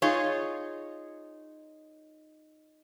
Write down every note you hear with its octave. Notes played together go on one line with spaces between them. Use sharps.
D#4 F4 G#4 C#5